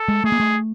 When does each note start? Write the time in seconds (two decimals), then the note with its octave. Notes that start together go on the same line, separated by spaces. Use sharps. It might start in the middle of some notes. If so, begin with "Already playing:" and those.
Already playing: A4
0.08 G#3
0.24 A3 G#4
0.32 A#3
0.40 A3